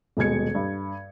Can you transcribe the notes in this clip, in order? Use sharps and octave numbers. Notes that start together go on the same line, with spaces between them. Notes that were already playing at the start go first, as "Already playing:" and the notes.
D#1 B2 G#3 G#6 C#7
G2